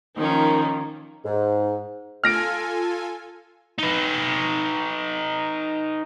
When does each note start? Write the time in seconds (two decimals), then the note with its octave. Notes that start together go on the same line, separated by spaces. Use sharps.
0.17 D#3 F3 A#3 C#4 D#4
1.25 G#2
2.24 F4 A4 G#5 F6 A#6 D7
3.79 D#4 B4